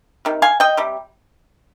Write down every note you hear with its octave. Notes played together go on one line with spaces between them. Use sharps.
C3 D#3
F5 G#5
D#5 G5
C3 G3